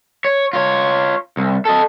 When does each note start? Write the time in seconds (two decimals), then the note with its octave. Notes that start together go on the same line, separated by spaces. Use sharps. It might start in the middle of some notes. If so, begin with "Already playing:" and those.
0.25 C#5
0.53 F4 C#5
1.37 C2
1.65 A4 D#5